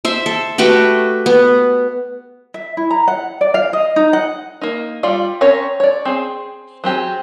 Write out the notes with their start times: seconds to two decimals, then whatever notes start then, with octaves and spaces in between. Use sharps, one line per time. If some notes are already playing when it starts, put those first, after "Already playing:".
0.05 C5 E5
0.26 A4
0.58 A3 F#4 G4 B4
1.26 B3
2.54 E5
2.77 E4
2.90 A#5
3.08 F#5
3.41 D5
3.54 F5
3.73 D#5
3.96 D#4
4.13 F#5
4.61 A#3 D#4
5.03 G3 F4 D5 F5
5.41 C4 C#4 A#4 C#5
5.80 C#5 D5
6.05 C4 G#4
6.84 F#3 C4 G4 G#4